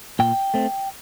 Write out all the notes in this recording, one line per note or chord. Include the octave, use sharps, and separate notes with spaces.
A#2 G5
A3 C4